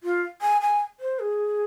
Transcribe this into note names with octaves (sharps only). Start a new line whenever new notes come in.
F4
G#5
G#5
C5
G#4